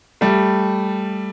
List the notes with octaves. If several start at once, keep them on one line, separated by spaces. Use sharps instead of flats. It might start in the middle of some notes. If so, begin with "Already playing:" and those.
G3 A3